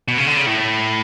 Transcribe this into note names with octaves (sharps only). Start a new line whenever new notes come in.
B2
C#3
D3
C#3
A2